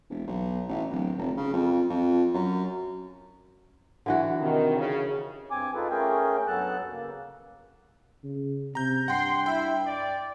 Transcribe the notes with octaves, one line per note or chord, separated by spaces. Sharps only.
E1
B1
A1
D1
F1
C#3
F2
F2
F#2
D3 E3 F#4
C3 D#3
C#3
G2 C4 G#5 D6
D#4 F4 G#4 A4 B4
A3 C#4 G#4 A#4 G5
G2 F#3 B3 A4 A5 F#6
C#3 A#3
C#3
C3 A#5 G6
G2 F#5 G5 C6
E4 G5
D5